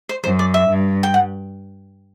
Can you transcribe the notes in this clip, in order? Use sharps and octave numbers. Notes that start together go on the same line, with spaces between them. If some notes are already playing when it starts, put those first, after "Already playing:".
C5
F#2 C5
D5
E5
G2
G5
F#5